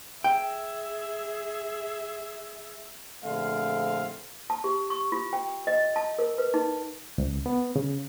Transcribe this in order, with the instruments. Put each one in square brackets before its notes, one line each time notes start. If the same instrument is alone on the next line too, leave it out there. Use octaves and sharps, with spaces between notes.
[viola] G#4 E5 [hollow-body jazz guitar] G5
[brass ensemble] A#1 D3 A3 C4 F5
[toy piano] A5
G4
C#6
F4
G5
D#5
A5
A#4
B4
D#4
[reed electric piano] C#2
B3
C#3